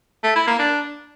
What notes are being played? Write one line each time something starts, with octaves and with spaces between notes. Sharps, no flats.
A3
E4
A#3
D4